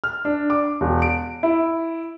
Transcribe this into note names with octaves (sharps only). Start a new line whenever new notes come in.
F6
D4
D6
E1
D7
E4